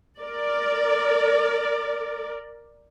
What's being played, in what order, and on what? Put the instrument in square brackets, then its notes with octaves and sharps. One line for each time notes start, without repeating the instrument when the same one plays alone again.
[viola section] A#4 D5